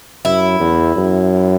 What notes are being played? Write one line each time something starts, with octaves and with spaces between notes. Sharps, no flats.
F#2 E4
E2
F#2